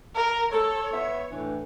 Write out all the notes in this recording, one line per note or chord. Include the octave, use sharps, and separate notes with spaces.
A#4
A4 C#5
B3 E5
A2 E3 D4